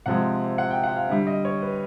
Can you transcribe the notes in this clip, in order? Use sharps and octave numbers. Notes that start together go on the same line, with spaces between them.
C3 F3 G#3 F#5
F#5
G5
F#5
F5
D3 G3 E5
D#5
C#5
B4